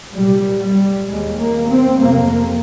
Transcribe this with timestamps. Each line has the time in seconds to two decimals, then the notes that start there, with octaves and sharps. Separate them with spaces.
0.13 C2 A#2 G3
0.60 G3
1.07 D#2 G#3
1.37 A#3
1.68 C4
1.99 F2 C3 A#3